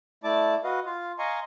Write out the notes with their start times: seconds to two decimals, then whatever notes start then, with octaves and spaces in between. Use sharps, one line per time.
0.24 A3 E4 D5 A5 D6
0.64 F#4 B4 D#5 F5
0.86 F4 F5
1.19 D#5 F5 G#5 A#5 C6 C#6